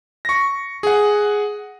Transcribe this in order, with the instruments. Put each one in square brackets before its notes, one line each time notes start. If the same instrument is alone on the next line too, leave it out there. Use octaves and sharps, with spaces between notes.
[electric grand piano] C#6 A#6
G#4 F#5